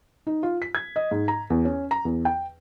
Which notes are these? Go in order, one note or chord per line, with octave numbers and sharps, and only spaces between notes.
D#4
F4
B6
G#6
D#5
G#2
A#5
E2
C#4
A#5
E2
G5